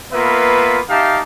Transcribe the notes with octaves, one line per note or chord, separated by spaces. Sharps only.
A#3 B3 F4 B4 E5
D#4 G4 E5 F5 A5